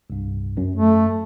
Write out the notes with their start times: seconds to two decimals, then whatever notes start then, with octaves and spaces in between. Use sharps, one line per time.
0.10 C2 G2
0.57 F#2
0.76 A3